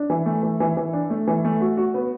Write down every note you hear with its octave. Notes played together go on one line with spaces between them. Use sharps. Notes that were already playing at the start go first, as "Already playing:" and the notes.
Already playing: D4
E3
A3
E3
E3
E3
D4
A3
E3
A3
F#4
F#4
B3